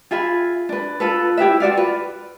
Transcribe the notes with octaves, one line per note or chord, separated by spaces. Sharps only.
F4 G#4 E5 B5
D4 B4
F4 A4 B4
E4 G4 B4 E5
F4 F#4 D5 F5
B4